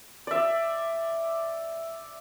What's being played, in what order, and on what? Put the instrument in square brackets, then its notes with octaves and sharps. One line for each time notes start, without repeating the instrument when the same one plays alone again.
[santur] D5 E5